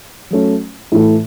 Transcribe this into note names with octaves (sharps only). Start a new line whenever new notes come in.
F#3 A3 C#4
A2 E3 A3